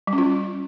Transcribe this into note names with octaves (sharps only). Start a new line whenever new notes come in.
G3
C#4
F4